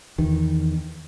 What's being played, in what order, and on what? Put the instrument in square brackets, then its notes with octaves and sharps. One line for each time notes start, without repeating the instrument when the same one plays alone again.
[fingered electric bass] E2 D#3